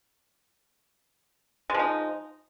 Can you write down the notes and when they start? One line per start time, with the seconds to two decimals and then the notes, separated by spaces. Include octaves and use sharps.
1.70 G#3
1.74 F3
1.79 D#4